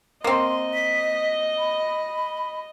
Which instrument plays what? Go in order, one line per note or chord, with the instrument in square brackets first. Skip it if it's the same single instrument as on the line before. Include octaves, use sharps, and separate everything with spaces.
[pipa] A#3 C4 [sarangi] D#5 [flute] C6
[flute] B6
B5